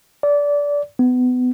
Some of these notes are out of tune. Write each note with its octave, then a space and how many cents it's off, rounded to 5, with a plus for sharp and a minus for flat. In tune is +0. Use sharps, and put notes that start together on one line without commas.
D5 -20
B3 +25